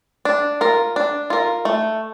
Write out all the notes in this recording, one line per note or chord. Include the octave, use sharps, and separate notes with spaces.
D4
F4 A#4
D4
F4 A#4
A3